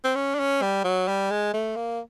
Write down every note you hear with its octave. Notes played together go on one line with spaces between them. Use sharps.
C4
C#4
D4
C#4
G3
F#3
G3
G#3
A3
A#3